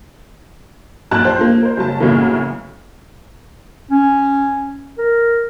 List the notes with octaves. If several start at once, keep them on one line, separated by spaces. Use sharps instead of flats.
A#1 F#2 A5 A#5 F#6
G4 C5
F3 A#3
A#4 C5
F#1 F#3 A5
B1 F#2 A2 C#3 E3 A#3
C#4
A#4